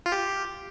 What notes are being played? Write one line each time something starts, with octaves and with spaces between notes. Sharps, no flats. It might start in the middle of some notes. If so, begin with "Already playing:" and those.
F4
G4